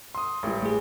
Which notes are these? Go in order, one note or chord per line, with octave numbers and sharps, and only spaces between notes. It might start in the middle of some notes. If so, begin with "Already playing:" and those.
C6 D#6
A1 G3
A3 G#4